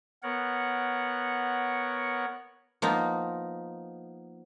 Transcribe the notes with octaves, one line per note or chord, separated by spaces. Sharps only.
B3 A#4 C#5 F#5
F3 A#3 B3 D#4